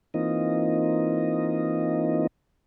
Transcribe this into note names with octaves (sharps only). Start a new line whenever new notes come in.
E3 A#3 C4 D#4 F4 D#5